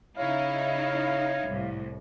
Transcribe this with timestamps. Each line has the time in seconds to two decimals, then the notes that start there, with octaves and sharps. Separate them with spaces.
0.17 C#3 D#4 E4 C#5 F5
1.44 C2 A2